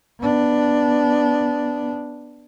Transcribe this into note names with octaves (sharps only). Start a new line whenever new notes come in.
B3 D4